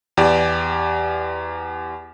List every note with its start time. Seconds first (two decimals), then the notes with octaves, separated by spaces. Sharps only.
0.17 E2 G4 D5